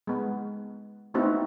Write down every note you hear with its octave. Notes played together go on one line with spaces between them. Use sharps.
G#3 B3
A3 B3 C4 D#4 E4 F#4